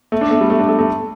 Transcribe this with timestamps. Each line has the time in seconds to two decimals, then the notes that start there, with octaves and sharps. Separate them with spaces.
0.12 A3
0.21 D4
0.31 A3
0.41 G3
0.50 A3
0.59 D4
0.69 A3
0.79 A3